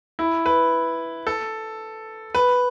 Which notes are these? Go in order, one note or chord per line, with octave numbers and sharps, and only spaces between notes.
E4
B4
A4
B4